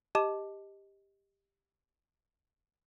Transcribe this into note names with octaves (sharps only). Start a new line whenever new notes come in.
G4 D#5 A5 D6 E7